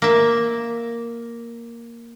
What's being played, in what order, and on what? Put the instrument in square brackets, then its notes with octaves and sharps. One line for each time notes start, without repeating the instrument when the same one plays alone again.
[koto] A#3 E5